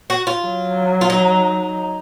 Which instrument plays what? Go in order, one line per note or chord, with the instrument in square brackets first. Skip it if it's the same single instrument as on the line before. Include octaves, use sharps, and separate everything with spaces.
[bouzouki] F#4
F4
[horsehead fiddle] F#3
[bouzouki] F4
D#4